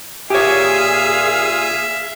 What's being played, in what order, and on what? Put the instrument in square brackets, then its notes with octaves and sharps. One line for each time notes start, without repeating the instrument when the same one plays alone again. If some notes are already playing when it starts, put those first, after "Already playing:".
[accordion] A#2 G#5 D#6 [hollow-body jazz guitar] G4 C#5 [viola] G#4 F5 [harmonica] E5